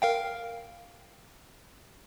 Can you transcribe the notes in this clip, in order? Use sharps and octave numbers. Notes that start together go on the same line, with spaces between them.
A#4 F5 G5